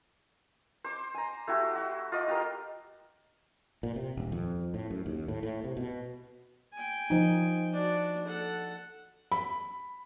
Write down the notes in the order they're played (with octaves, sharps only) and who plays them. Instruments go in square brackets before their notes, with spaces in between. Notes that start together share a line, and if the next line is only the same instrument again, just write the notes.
[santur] C5 D6
G#5 A#5
A3 E4 F#4 G4
F#4
F4 D#5 D6
F#4 G4 A#4
[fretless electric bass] A#2
C3
D#1
F2
A2
F#2
D#2
A2
A2
C3
B2
[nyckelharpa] G5 G#5
[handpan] F3 D#4
[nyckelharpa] D4 F#4
A4 F#5
[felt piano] B5